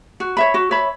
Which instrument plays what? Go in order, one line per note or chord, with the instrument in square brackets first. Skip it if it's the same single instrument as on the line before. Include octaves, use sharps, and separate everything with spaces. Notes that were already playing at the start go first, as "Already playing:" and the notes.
[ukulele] F#4
C#5 E5 B5
F#4
C#5 E5 B5